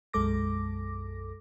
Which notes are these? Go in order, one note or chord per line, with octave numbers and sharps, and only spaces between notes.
B1 F#2 G#3 A4 D6 A#6